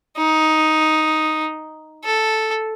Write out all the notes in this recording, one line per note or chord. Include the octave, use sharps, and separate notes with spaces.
D#4
A4